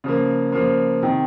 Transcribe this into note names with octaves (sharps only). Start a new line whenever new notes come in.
C#3 F3 A#3
C#3 F3 A#3
C3 D#3